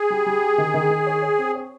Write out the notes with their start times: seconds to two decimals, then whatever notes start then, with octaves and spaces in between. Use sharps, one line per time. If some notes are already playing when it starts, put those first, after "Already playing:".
Already playing: G#4
0.10 G3
0.26 G3
0.42 G4
0.58 D#3
0.74 D#3
0.90 D#3
1.07 C#5
1.22 C#5
1.38 C4
1.55 C#5